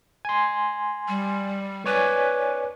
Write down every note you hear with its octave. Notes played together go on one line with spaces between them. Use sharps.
G#5 C6
G3
B4 C#5 D5 G#5